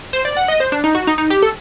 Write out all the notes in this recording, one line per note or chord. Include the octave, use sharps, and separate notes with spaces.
C5
D5
F#5
D#5
C5
D4
D#4
F#4
D#4
D#4
G4
A4